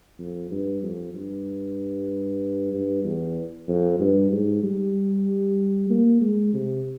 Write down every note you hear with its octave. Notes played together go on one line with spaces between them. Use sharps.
F2
G2
F2
G2
G2
E2
F2
G2
G#2
G3
A#3
G#3
C3